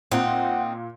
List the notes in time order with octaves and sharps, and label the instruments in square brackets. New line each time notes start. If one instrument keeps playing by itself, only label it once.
[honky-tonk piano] A#2 [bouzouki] C4 D#4 [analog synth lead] F#5 [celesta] G5